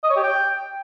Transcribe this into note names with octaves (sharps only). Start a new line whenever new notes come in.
D#5
C#5
G4
G5